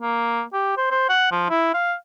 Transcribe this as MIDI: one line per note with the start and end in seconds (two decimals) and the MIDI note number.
0.01 0.43 58
0.53 0.73 67
0.77 0.86 72
0.91 1.06 72
1.09 1.30 78
1.31 1.48 53
1.50 1.73 64
1.74 1.94 77